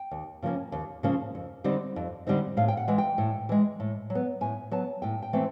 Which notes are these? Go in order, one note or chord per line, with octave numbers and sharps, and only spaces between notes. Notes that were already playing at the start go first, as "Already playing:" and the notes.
Already playing: G5
D#2
C#3 F3 A#3 C#4
D#2
C#3 F3 A#3 C#4
F2
D3 G3 C4 D#4
F2
D3 G3 C4 D#4
A2 F5
G5
F#5
E3 G#3
G5
A2
E3 G#3
A2
F#3
B3
A2 G#5
F#3 B3 A5
A2 G5
G5
E3 A3 C4